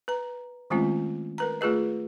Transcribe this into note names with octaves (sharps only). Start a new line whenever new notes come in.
B4 A#5
D#3 G#3 A3 C4 C#4 F4
A#4 B4 A#5
A3 F4 G#4 B4 D#5